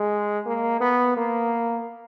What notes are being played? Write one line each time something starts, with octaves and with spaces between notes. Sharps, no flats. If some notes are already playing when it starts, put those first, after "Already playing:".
Already playing: G#3
A#3
B3
A#3